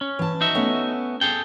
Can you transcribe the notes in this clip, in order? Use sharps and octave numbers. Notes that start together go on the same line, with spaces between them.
C#4
E3 A5
D#4 F#4 E5
A3 B3 C#4
G#4 A4 G5